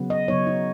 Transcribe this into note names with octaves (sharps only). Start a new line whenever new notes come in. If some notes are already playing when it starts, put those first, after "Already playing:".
Already playing: C#3 F#3 B3
D#5
C#3 F#3 B3 D#4 C#5
D#4